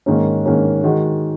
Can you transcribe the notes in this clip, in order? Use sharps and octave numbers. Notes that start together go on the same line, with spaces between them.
G#2 D#3 A#3 C#4
G#2 D#3 A#3 C#4
D#3 G#3 F#4